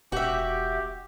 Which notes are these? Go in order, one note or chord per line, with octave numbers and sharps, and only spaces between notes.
E1 F#4 G4 E5